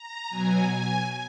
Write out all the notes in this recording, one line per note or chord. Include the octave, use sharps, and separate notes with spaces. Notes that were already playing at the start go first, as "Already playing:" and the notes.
Already playing: A#5
B2 F#3 G#5
G#5